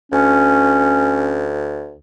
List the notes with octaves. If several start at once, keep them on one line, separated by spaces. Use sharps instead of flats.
D2 C#4